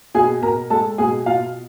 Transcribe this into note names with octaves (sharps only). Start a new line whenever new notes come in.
B2 G#4 G#5
B2 A#4 A#5
G#3 A4 A5
B2 G#4 G#5
B2 F4 F5